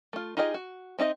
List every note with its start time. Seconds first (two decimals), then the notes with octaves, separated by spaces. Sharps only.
0.13 A3 F4
0.37 D#4 F4 G4 G#4 D#5
0.54 F#4
0.98 C4 D#4 G#4 D#5 E5